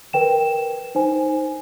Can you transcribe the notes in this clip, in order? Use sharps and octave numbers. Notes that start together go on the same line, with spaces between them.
A#4 B4 G5 E7
D#4 C5 G#5